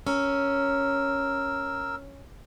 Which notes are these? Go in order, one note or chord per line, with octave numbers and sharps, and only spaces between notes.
C#4 A#4 E6